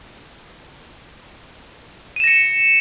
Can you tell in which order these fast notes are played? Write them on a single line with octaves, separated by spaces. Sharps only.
D#7 E7 A#6 C#7